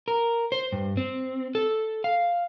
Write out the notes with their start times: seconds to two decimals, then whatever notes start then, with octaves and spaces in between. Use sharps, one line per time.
0.08 A#4
0.52 C5
0.72 G2
0.97 C4
1.55 A4
2.04 F5